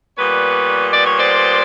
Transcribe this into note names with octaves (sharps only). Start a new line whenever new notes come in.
A#2 G3 B3 B4 C#5
D5
C#5
C5 D5